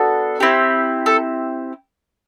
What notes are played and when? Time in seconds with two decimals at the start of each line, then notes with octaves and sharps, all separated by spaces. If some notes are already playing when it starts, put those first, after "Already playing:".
Already playing: B3 D4 F#4 A4
0.40 C4 E4 G4
1.06 A4